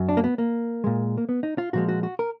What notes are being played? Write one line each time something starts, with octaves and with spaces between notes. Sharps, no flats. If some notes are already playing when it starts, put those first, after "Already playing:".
Already playing: F#2
D4
A#3
B3
A#3
A#2 G#3
A#3
B3
D#4
F4
A#2 F3 G#3 F#4
F#4
F#4
A#4